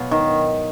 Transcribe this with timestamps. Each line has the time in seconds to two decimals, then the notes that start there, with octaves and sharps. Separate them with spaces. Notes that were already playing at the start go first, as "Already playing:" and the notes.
Already playing: B2 F#3 B3 F4
0.11 D#3